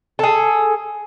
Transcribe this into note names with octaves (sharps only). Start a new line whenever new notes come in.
G#4 A4